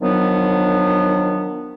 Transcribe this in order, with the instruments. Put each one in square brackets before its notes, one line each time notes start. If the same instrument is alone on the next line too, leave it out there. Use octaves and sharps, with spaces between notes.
[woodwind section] D#3 F3 F#3 B3 D4